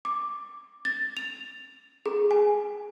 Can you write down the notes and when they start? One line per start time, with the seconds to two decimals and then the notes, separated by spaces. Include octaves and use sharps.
0.05 D6
0.85 A6
1.17 F7
2.06 G#4
2.31 G#5